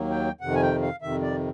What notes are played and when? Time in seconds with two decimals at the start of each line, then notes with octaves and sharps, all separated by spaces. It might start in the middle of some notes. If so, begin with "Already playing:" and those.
Already playing: D#2 D#3 F#3 A#3
0.11 G5
0.41 F2 C3 D#3 F#5
0.55 G#5
0.62 G5
0.82 F5
1.02 F2 C3 D#3 E5
1.22 D5